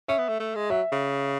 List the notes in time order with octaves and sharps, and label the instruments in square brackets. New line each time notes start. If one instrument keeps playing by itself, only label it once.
[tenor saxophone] C#4 [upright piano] E5
[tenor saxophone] B3
A3
A3
G#3
[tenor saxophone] F#3 [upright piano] E5
[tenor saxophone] C#3